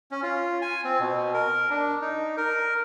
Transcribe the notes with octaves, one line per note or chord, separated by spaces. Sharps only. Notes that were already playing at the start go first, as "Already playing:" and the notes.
C#4
F4
G#5
C4
B2
A#4
D4
D#4
A#4